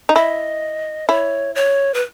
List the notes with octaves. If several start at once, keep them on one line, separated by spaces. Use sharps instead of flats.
D#4
E4 D#5
E4 C#5
C#5
B4